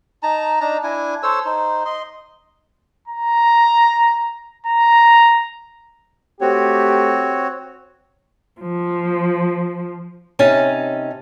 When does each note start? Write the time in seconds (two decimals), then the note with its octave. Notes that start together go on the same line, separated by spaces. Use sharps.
0.23 D#4 A5 A#5
0.60 D4 D#4 A5 A#5
0.83 D4 E4 G#5
1.23 A4 C5 C#5 E6
1.45 D#4 C5
1.85 D#5 C6
3.08 A#5
4.67 A#5
6.41 A3 C4 F#4 G4 C#5
8.61 F3
10.39 C3 C#4 D#4 A5